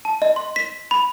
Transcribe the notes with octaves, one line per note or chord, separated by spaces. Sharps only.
A5
D#5
C6
B6
B5